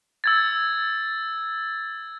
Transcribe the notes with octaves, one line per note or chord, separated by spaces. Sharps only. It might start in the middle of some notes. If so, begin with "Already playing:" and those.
E6 G#6 A6